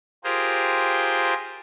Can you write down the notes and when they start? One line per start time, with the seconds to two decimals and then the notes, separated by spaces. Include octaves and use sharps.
0.24 F4 G4 G#4 A#4 C5